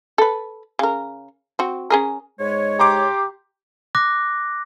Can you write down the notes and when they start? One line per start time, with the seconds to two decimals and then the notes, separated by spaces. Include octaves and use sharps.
0.18 A4 B4
0.79 C#3 A#4
1.59 C4 F#4
1.90 C#4 G#4 A#4
2.39 G#2 G#3 C#5
2.79 G4 A#5 C6 D6
3.95 D6 F#6 A#6